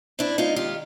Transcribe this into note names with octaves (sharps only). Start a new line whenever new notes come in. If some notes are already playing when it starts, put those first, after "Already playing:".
C4 D4 E4
G#3 D#4 F4
D#3 F4 G4